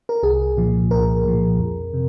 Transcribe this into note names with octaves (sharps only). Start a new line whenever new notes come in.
A#4
C2 G#4
A#2 F3
C2 A#4
A#2 F3
F2
C3